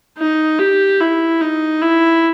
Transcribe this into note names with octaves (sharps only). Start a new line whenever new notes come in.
D#4
G4
E4
D#4
E4